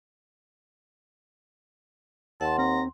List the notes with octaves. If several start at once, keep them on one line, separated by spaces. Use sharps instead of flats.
D#2 F#5 A5 C6
C4 A#5